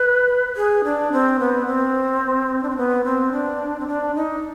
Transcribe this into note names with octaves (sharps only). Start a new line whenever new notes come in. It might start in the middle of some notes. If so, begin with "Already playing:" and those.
Already playing: B4
G#4
D4
C4
B3
C4
D4
C4
B3
C4
D4
C4
D4
D#4